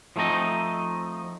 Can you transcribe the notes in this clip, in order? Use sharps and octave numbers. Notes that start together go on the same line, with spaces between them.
F3 A3 C4 D#4 D#5